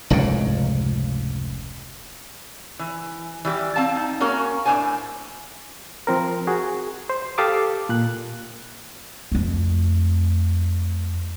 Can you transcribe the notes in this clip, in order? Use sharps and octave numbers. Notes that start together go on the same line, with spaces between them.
F1 C#2 G#2 C#3
E3
E3 G3 G4
C4 F5 A5
D#4
A#3 C#4 F#4 A#4
A2 C4 D4 C5 G#5
F3 C4 A#4
F#4 G#4
C5
G4 A4 F5 A5 D6 D#6
A#2 F#6
F2 A3